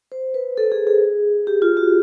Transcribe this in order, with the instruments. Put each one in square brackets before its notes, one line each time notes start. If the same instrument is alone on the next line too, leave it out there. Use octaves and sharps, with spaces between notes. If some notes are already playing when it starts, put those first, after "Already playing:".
[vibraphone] C5
B4
A4
G#4
G#4
G4
F4
F#4